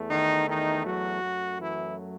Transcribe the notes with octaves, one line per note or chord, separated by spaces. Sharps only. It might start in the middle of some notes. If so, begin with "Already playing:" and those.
Already playing: E2 A3
D#3 D#4
D#3 D#4
F#3 F#4
F#2 F#3 A3
E3 E4